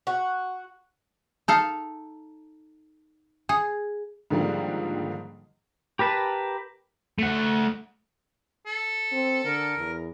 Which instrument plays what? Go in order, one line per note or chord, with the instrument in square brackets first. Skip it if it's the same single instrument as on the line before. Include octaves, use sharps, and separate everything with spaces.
[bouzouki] F#4
[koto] D#4 A4 F5
G#4
[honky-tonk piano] G#2 D3 D#3 F3 G3 A#3
[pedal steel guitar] G4 A#4 B4 A5
[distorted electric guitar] A3 F#5
[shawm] A4
[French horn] C4
[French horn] D3 [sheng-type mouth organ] A#4
[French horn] E2